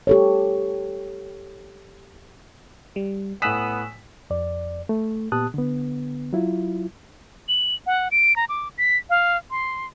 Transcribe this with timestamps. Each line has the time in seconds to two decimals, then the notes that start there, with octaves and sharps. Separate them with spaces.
0.07 G4 A4 C#5
2.96 G3
3.42 A2 B3 G#5 D#6 E6 F#6 B6 E7
4.30 F2 D5
4.89 A3
5.32 A#2 B3 G4 A5 D#6 F#6
5.54 D3 B3
6.33 F#3 E4 F4
7.49 F#7
7.87 F#5
8.11 D7
8.36 A#5
8.49 D6
8.78 B6
9.10 F5
9.51 C6